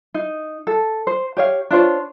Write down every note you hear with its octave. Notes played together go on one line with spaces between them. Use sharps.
D#4
A4
C5
G4 C#5 F5
D4 F4 C5 C#5